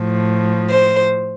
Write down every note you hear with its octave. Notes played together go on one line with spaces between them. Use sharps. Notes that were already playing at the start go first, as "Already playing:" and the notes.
Already playing: A2 F3
C5